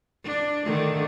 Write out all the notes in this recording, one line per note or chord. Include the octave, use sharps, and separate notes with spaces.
D4
D3 D#3 A3